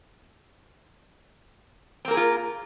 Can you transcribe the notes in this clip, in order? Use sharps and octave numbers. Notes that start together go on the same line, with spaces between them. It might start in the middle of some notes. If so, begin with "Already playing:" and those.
A#3 C4 F4 G#4 A#4